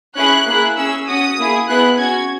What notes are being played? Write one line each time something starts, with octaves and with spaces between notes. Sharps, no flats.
C#4 E4 G#4 F#6
A#3 E4 G#4
C#4 G#4 E6
C#4 F#4 D#6
A#3 E4 G#4
B3 E4 G#4 F#6
C#4 F#4 G#6